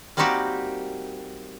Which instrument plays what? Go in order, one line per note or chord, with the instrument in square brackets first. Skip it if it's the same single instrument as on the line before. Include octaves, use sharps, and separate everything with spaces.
[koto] G3 A#3 C4 D#4 F#4 G4